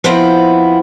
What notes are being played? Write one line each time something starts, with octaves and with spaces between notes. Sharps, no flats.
F3 B3 C4 E4 F4